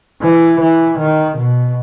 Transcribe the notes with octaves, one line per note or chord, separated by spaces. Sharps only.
E3
E3
D#3
B2